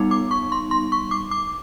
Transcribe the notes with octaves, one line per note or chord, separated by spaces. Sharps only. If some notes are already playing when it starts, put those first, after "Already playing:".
Already playing: G3 B3 D#4
D6
C#6
C6
C6
C#6
D6
D6